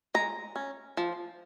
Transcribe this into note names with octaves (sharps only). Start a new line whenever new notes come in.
G#3 A#5
C#4
F3